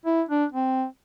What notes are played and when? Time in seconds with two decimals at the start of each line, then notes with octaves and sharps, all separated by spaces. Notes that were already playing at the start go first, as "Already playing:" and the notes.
0.06 E4
0.29 D4
0.52 C4